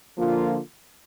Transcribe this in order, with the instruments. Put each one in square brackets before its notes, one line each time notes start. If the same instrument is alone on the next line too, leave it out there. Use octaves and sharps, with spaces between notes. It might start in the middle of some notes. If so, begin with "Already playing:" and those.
[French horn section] D3 F3 A#3 F4